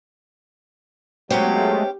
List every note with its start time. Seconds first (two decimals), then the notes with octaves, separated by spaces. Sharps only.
1.31 F#3 G#3 A3 B3 C#4 G4 C5